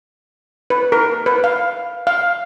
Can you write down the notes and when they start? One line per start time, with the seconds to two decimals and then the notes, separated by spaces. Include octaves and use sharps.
0.70 B4
0.92 A#4
1.26 B4
1.44 F5
2.07 F5